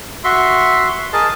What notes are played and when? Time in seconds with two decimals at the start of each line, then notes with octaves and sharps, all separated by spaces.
0.24 F#4 E5 C6
1.13 G#4 A#4 D#5 A5